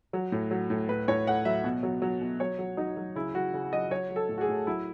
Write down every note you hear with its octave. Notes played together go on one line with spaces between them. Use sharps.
F#3
A2
F#3
A2
A2 B4
A2 C#5
A2 F#5
F#3 E5
B2
F#3
F#3
B2
F#3 C#5
F#3
F#3 D#4
F#3
C#3 E4
F#3 F#4
C#3
F#3 D#5
F#3 C#5
F#3
A4
A2
F#4
G#4
A2
F#3 E4